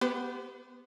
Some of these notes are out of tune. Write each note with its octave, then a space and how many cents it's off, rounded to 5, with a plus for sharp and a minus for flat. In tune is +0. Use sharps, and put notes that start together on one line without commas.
B3 +0 G4 +0 C5 -40